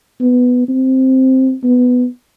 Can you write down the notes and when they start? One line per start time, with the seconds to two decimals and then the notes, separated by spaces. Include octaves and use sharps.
0.21 B3
0.68 C4
1.63 B3